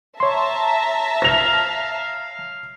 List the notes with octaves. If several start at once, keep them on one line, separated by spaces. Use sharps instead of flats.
C#5 E5 A5 A#5 C6
F5 A#6 F7